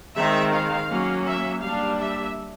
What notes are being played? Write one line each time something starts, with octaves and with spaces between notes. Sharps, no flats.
D#3 G#3 C4 E5
F5
F#3 A#3 C#4
E5
G3 A#3 D4 F5
E5